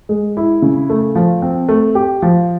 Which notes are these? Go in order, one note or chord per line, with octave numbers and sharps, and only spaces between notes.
G#3
E4
C#3
A3
F3
C4
A3
G4
F3